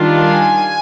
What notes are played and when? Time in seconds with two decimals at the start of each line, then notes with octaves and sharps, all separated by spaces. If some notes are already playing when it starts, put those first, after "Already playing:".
Already playing: D#3 G3 D4 F4
0.24 G#5